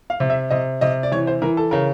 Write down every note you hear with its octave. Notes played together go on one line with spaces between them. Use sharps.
F5
C3
E5
C3 D#5
C3 D#5
D5
E3 C#5
C5
E3 A#4
A4
C#3 A#4